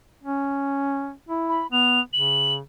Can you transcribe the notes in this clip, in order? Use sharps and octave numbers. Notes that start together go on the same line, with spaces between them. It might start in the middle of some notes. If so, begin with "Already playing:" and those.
C#4
E4
B5
B3 F7
C#3 F#7